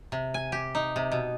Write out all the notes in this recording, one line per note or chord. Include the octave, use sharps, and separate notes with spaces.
C3
G#5
G4
D#4
C3
B2